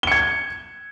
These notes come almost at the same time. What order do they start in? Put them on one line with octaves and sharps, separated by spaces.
G7 C#7 G#6